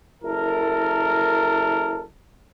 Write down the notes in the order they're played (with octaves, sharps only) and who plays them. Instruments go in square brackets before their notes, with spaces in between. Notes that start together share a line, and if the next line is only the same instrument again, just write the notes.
[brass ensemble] F#1 E4 A4 A#4